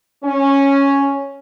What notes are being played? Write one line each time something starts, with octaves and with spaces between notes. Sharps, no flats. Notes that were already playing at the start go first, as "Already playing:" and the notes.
C#4